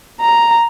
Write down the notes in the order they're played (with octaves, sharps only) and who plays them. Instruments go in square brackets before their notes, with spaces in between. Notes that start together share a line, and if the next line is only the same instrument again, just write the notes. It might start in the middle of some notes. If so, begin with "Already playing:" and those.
[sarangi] A#5